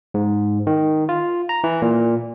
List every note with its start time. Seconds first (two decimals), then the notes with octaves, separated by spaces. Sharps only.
0.14 G#2
0.67 D#3
1.09 F4
1.49 A#5
1.64 E3
1.82 A#2